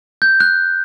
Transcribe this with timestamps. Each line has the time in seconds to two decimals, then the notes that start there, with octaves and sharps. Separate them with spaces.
0.22 G6
0.40 F#6